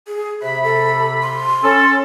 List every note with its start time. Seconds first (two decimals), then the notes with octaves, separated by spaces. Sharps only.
0.07 G#4
0.42 C3 E5 B5
0.64 A4
1.22 C6
1.63 C#4 A4